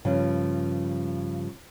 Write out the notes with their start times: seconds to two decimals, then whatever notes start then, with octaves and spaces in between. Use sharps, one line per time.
0.05 G2 C#3 F3